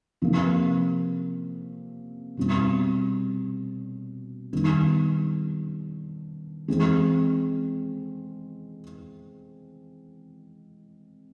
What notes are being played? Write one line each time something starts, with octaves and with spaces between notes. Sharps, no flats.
C3 F3 A#3
B2 G3 C4
D#3 G3 B3
E3 G#3 C4